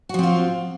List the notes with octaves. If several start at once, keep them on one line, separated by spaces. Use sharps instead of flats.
F3 C4 F4 F#4